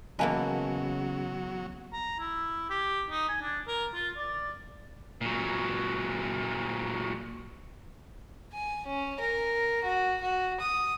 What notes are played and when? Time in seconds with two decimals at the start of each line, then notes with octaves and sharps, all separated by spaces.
0.19 E2 C#3 F#3 A#3 B4 D#5 G#5 A5
1.93 A#5
2.20 E4
2.70 G4
3.10 D#4
3.28 G#5
3.41 D4
3.68 A#4
3.94 F4
4.17 D5
5.21 A#2 F#3
8.53 G#5
8.87 C#4
9.20 A#4
9.84 F#4
10.22 F#4
10.61 D#6